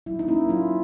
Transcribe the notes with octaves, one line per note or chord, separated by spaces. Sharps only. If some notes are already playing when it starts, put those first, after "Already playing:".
F#3 E4
D#4
A#3 C#4 E4
F#3 F4